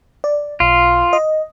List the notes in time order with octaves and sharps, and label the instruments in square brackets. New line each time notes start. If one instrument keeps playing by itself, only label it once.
[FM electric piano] D5
[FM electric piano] B1 [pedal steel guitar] F4
[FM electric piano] D#5